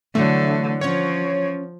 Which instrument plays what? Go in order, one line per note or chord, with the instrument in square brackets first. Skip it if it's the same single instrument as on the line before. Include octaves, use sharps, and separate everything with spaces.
[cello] D3 [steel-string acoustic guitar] E3 F#3 [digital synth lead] A3
[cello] F3 [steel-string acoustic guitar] C#4 F#5 [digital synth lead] C#5